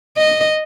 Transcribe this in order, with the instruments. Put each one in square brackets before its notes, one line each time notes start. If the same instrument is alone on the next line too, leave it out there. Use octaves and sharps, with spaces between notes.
[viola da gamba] D#5